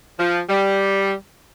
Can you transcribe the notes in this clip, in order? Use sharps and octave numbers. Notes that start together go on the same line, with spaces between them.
F3
G3